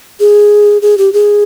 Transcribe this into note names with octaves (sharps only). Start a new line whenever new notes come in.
G#4
G#4
G4
G#4